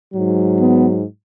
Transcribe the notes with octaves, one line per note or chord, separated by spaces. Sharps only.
G#2 F#3
B3